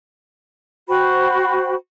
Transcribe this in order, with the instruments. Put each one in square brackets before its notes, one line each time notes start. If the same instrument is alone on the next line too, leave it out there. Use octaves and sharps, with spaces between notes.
[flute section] F#4 C5 G5 B5